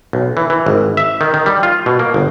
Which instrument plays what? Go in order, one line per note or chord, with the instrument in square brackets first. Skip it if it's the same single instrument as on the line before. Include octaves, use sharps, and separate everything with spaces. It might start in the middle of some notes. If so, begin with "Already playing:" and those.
[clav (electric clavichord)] B1
E3
E3
G#1
E5
D#3
D#3
G3
F4
B2
A#3
G1